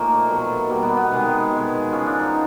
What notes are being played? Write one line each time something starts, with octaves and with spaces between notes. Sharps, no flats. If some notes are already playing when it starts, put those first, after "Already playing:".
Already playing: A#2 F3 A3 A#3 D#4
B2 F#3 A3
B2 G3 A#3
B3
B3
C3 D#3 G#3
B2 G#3
C#3 F3 G#3 C#4
D4
D#4